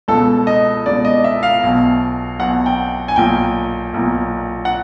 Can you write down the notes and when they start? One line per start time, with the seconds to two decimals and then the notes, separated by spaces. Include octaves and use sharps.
0.08 C#2 B2 A4
0.47 D#5
0.86 C#2 B2 D5
1.05 D#5
1.24 E5
1.43 F5
1.63 B1 B2
2.39 B1 B2 F#5
2.66 G5
3.08 G#5
3.16 B1 A#2 G5
3.94 B1 A#2
4.65 F#5